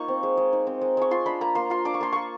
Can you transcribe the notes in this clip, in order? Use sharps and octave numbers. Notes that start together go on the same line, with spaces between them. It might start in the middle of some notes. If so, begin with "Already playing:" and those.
Already playing: A#3 D#4 F4 C#6
C4
G#3
G#3
D#4
C4
G#3
G#3 C#6
F4 C6
D4 B5
A#3 A#5
A#3 C6
F4 C6
D4 D6
C#6
A#3 C6
A#3 C#6